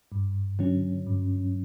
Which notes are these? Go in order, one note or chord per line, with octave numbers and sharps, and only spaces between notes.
G2
D3 F#3 C#4
G2